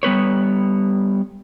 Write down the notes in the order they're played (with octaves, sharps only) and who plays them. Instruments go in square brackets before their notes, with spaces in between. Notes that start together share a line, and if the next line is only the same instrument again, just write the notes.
[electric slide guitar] G3 B3 B4 C#5